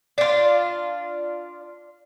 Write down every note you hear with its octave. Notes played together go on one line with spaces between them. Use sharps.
D4 F4